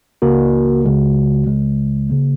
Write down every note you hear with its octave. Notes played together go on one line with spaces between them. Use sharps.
C#2 C#3 A#3 F#4 A#4
C#2 C#3 G#3 F#4
C#2 C#3 G#3
C#3 A#3